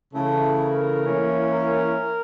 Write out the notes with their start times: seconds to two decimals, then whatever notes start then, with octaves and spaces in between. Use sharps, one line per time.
0.14 C#3 E3 A3 E4 A4
0.59 A#4
1.05 E3 A#3 C#4 E4
1.51 A#4